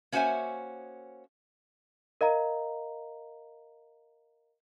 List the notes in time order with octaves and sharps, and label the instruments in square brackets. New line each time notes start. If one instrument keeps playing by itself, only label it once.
[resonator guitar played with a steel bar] A#3 C#4 F#4 C5 E5 G#5
[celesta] A#4 D#5 F5 A#5